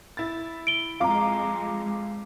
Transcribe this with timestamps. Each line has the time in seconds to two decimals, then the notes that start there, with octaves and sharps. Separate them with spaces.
0.17 E4 A6
0.67 D7 G7
1.00 F2 G#3 F4 F5 A#5 D6